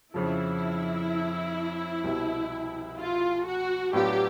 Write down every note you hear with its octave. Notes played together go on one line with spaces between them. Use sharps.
F2 C#3 F3 E4
C2 B2 G3
F4
F#4
A2 F#3 B3 D4 F4 G4